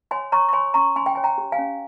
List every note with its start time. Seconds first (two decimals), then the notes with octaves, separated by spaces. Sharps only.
0.11 C#5 G#5 C6
0.32 C#5 A#5 C#6
0.49 C#6
0.53 C#5 G#5 C6
0.74 C#4 A#5 C#6
0.96 C#4 G#5 C6
1.06 G5
1.15 C#5 G#5
1.24 G5 A#5
1.38 G4
1.52 F5 G#5
1.58 C#4